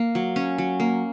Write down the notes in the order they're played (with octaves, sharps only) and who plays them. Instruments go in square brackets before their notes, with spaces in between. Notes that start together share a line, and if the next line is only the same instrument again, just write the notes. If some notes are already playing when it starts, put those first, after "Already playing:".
Already playing: [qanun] A#3
F#3
C#4
F#3
A#3